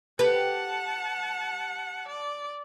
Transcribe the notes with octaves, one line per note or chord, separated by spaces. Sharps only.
G4 B4 F#5 A5
D5